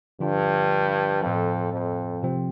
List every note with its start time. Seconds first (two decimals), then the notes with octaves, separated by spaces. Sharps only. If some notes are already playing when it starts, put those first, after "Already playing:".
0.20 G2 D3 F3 D4 F4
1.22 F2 A2 F3 C4 A4
1.73 F2
2.23 C3 F3 C4